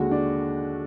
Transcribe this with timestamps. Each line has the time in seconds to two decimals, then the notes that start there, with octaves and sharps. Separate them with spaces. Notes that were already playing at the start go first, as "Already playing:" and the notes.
Already playing: D#2 D3 G#3 F#4
0.11 D4